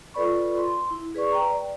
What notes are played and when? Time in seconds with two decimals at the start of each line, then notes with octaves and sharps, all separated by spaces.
0.14 F4 A4 B4 D5 B5 C#6
0.57 C6
0.91 E4
1.14 G#4 B4 D5 C#6
1.32 B4 G5 A#5
1.50 D5